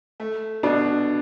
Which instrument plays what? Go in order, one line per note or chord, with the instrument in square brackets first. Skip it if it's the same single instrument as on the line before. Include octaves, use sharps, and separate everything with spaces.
[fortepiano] A3
[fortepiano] B2 [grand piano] D4